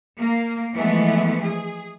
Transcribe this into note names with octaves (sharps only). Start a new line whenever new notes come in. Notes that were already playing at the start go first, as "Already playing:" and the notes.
A#3
E3 F3 G#3 A3 B3
G#4